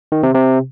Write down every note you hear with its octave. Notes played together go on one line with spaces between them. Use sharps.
D#3
C3
C3